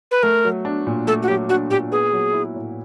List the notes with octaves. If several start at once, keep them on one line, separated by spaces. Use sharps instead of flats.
B4
A3 A#4
F#3
D4
A#2
A3 A4
F#4
F#3 G4
D4 F#4
A#2 G4
B3 G#4
F#3
E4
A2